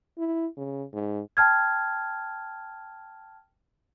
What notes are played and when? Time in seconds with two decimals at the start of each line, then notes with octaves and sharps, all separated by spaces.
0.18 E4
0.57 C#3
0.93 G#2
1.37 G5 A5 F6 G#6